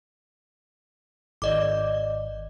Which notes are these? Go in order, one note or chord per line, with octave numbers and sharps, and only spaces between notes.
G#1 D5 D#5 D6